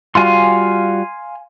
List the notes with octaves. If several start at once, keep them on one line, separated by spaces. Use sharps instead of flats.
G3 F4 F#4 F5 G#5 C6